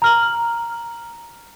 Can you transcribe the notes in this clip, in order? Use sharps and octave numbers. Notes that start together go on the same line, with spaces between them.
A#5 F6 F#7